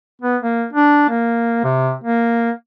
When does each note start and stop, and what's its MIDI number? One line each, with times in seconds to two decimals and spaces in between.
0.22 0.37 59
0.42 0.65 58
0.73 1.07 62
1.09 1.61 58
1.64 1.94 48
2.04 2.51 58